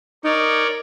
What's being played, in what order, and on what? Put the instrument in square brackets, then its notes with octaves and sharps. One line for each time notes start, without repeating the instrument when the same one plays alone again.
[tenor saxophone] D#4 [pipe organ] A#4 C#5 D5